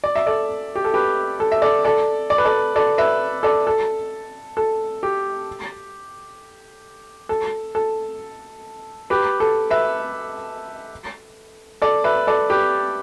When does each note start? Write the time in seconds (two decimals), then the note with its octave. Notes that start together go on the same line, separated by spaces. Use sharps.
0.04 D5
0.15 E5
0.26 A4 D5
0.75 G4
0.85 A4
0.94 G4 B4
1.40 A4
1.52 E5
1.62 A4 D5
1.85 A4 D5
2.30 D5
2.38 B4
2.45 A4 D5
2.76 A4 D5
2.98 B4 E5
3.43 A4 D5
3.67 A4
4.57 A4
5.03 G4
7.29 A4
7.75 A4
9.10 G4 B4
9.40 A4
9.70 B4 E5
11.82 A4 D5
12.04 B4 E5
12.27 A4 D5
12.50 G4 B4